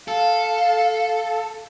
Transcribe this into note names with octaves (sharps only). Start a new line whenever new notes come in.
A4 F5